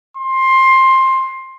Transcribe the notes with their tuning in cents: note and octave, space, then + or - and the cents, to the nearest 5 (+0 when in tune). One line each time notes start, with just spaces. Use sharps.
C6 +15